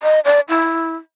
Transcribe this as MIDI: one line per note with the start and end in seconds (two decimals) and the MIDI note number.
0.03 0.20 75
0.25 0.40 74
0.49 0.95 64